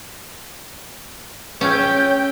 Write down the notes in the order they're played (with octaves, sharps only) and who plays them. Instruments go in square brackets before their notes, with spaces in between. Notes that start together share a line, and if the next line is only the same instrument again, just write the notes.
[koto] C#4 [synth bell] G#4 E6 F6 [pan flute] C#5 [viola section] G5